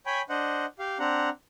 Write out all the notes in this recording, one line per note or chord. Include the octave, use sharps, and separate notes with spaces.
C#5 G5 G#5 B5
D4 C5 D#5 F#5
G4 F5
C4 D4 F#5 A#5